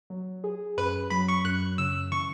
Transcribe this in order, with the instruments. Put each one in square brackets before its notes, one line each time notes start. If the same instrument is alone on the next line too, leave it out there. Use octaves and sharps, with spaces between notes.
[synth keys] F#3
G#4
[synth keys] F#2 [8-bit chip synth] B4
[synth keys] F#3 [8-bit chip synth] B5
[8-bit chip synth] C#6
[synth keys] F#2 [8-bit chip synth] F#6
[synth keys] C#3 [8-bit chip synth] E6
[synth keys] E3 [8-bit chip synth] C#6